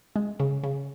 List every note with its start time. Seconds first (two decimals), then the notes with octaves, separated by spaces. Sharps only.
0.16 G#3
0.40 C#3
0.63 C#3